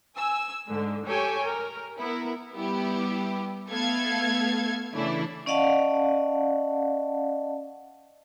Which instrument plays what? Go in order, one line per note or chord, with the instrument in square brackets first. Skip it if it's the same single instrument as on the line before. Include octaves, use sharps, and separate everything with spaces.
[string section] G#5 E6
G#2 D3
G4 A4 C#5 G5 G#5
A#4
B3 E4 A#4
G3 B3 E4 G4
A3 B3 A4 F5 G#6
C#3 E3 A3 D4 E4
[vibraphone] C#4 D5 D#5 F5 F#5 A5